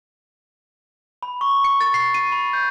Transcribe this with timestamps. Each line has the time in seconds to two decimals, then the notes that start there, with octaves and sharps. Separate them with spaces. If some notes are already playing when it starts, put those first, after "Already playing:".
1.23 B5
1.41 C#6
1.64 C#7
1.81 A6
1.94 C7
2.14 D#7
2.32 B5
2.53 G6